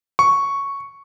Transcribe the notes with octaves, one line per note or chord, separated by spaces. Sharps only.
C#6